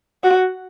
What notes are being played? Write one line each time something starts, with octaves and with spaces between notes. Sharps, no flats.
F#4